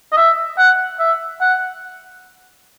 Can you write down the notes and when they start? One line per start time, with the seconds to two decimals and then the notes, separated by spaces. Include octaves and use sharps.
0.12 D#5
0.17 E5
0.58 F#5
0.99 E5
1.41 F#5